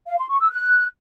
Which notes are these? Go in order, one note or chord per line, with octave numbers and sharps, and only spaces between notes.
F5
C6
C#6
E6
F#6